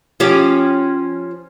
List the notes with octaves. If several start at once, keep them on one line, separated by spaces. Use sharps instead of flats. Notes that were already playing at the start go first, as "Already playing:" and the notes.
F3 C#4 G4